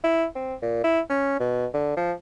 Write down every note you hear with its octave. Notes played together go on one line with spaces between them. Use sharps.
E4
C4
A#2
E4
C#4
B2
D3
F3